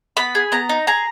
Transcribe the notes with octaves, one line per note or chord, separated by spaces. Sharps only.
B3 B5
G#4
B3 A#5
D#4
G#4 A#5